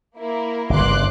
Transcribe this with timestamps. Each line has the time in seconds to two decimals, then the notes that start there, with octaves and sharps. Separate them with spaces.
0.18 A#3 E4 A#4
0.70 G1 C#3 C6 D6 F#6